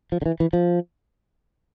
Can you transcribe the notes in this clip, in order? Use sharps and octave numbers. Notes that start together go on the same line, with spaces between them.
F3
D3
E3
E3
F3